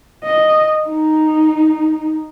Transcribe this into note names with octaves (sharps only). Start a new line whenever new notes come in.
D#5
D#4